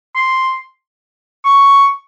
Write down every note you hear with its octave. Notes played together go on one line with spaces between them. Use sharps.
C6
C#6